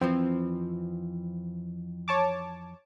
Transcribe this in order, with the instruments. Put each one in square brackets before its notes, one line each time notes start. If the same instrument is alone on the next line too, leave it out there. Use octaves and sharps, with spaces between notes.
[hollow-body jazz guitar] F2 E3 F3 [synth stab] C4
[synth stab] C#5 A5 D6